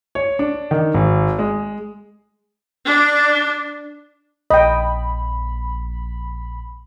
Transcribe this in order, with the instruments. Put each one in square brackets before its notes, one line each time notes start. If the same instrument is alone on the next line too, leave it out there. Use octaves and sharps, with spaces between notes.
[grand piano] C#5
D4
D#3
G#1
G#3
[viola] D4
[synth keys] A#1 B5 [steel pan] D#5 G5